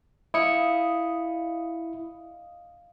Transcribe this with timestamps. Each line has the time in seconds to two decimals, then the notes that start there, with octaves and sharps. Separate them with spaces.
0.34 E4 D#5 F5 C#7